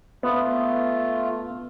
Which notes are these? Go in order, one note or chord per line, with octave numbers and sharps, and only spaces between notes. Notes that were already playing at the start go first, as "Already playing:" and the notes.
A3 B3 F4